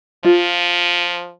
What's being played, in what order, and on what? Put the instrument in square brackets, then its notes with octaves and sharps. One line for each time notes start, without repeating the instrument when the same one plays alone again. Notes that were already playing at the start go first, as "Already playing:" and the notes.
[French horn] F3 [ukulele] F4